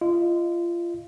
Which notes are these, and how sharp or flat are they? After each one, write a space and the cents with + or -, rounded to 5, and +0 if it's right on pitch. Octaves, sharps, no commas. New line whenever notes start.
F4 -25 D#5 -10